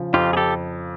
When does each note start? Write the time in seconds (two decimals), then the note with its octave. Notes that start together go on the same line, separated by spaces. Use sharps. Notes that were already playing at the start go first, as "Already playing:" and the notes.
Already playing: C#3 F3
0.13 F2 F4 G4
0.33 G#4
0.37 G4 A4